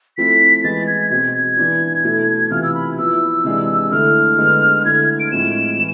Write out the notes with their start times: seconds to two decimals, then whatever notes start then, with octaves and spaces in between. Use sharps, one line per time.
0.17 F3 A3 C4 E4 B6
0.64 E3 G#3 B3 E4 A6
0.87 G#6
1.10 B2 G#3 C4 G#6
1.34 G#6
1.58 E3 B3 D4
2.04 B2 A3 E4
2.51 C3 E3 B3 F4 F6
2.63 E6
2.75 B5
2.97 F3 B3 E4 E6
3.44 C3 E3 G#3 D4
3.91 D3 A3 E4 F6
4.38 D3 G#3 B3
4.85 D3 A3 E4 G#6
5.20 D7
5.32 A2 F3 G#3 C4 E7
5.79 E3